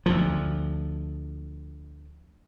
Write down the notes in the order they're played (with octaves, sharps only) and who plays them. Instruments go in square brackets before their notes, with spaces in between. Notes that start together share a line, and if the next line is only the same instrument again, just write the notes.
[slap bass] D2 F3